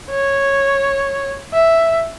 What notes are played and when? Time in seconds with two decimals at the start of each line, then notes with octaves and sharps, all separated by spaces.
0.10 C#5
1.53 E5